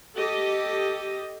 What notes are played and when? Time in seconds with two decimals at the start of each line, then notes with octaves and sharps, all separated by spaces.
0.16 G4 A4 D#5